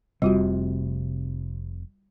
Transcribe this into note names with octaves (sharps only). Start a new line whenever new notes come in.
F1 C3 G3 F4 F#4